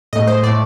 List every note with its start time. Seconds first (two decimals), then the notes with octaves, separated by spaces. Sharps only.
0.13 A2 A3 D#5
0.27 C5
0.43 A2 A3 D5